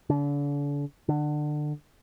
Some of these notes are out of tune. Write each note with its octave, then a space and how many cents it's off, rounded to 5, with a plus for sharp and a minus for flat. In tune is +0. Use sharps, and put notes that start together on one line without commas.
D3 -40
D3 +25